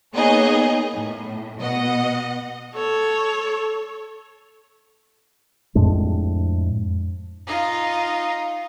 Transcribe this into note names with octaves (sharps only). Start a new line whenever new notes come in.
A#3 B3 D#4 G#4 C#5 D#5
A2
B2 D#5 F#5
A4 C#5
F2 A2 G#3 D4
D#4 F4